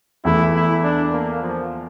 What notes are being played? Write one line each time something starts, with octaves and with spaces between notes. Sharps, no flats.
E2 E3 A3 E4
E4
D4
A#3
F3